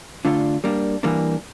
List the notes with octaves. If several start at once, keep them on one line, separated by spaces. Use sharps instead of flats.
D3 A3 D4 F4
G3 A#3 D4
E3 G3 A#3 D4